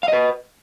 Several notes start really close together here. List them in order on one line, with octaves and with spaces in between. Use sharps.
F5 D#5 B4